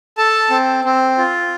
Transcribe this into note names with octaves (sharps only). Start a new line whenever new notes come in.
A4 A5
C4
C4
F4